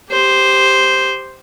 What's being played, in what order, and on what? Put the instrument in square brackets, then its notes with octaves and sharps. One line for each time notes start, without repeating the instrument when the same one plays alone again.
[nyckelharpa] G4 C5